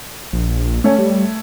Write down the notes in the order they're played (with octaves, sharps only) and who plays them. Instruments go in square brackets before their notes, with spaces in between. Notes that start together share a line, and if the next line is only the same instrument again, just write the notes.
[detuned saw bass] A#1
[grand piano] A3 C#5 [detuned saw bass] C#4
[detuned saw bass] G3